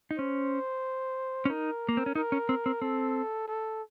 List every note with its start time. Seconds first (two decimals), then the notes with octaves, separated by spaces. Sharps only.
0.11 D#4
0.18 C#4 C5
1.45 C#4
1.50 D#4 A#4
1.89 A#3
1.97 C4
2.06 C#4
2.15 D#4 A#4
2.32 C#4
2.49 C4
2.66 C4
2.82 C4 A4
3.48 A4